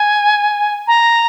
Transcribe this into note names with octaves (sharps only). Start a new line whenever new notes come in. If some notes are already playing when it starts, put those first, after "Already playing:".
Already playing: G#5
A#5